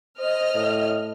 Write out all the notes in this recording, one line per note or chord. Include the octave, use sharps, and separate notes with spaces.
C5 D#5 F6
A2